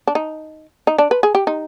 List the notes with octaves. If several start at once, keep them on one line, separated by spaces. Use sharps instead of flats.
D4
D#4
D#4
D4
B4
G#4
G4
D#4